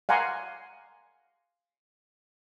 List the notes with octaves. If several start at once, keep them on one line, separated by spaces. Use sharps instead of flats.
F5 F#5 G#5 A#5 C6 D6